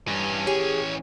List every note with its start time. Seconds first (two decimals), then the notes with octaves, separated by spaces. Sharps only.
0.08 G2 E3 C#4
0.47 G4 G#4 C#5